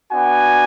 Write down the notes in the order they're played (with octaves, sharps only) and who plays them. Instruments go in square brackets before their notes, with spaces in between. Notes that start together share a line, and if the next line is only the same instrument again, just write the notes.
[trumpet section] B3 D4 F#4 G#5